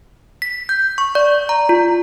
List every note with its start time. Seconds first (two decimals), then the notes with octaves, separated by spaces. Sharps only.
0.42 B6
0.69 G6
0.98 C#6
1.15 D5
1.49 A#5
1.69 F4